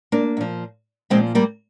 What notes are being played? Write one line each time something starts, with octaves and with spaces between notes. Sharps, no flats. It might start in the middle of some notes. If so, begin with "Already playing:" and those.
A#3 D4
A#2 F3
A#2 F3 G#3 C4
G3 A#3